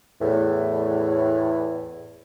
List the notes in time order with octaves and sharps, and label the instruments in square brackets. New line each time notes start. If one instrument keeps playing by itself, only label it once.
[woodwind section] E2 A2